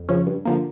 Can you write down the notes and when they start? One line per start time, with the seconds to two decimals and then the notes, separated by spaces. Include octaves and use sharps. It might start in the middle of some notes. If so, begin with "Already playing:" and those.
Already playing: F2
0.09 C#3 F3 C#4
0.26 G2
0.45 D3 F3 A#3